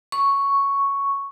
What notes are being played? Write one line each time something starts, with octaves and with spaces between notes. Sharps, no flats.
C#6